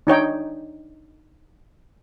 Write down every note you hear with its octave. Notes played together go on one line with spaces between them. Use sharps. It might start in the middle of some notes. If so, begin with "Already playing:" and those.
D4 D#4 C#5 G5